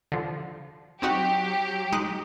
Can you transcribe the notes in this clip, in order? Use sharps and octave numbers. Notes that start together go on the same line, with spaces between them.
D3 F3
F#3 C4 D#4 F#4 G4
G#3 D#4 F#6